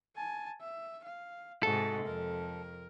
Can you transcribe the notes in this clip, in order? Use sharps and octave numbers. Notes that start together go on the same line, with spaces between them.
G#5 A5
E5
F5
G#2 C3 G#3 F#4 G#4 A4
F2 A#4